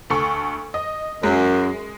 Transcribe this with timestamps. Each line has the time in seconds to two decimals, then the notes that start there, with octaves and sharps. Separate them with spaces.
0.10 D2 A4 C#6
0.74 D#5
1.23 F#2 G#3